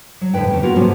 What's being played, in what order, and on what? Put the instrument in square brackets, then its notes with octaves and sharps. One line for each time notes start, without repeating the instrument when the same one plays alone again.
[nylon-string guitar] F#3
F2 A2 D3 B4 G5
E2 C#3
A#3 B3 F4 F#4
G#2 C3 F3 F#3 A3 C#4